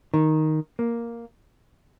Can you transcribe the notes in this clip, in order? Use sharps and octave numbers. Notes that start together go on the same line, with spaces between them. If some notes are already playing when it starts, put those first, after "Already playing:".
D#3
A#3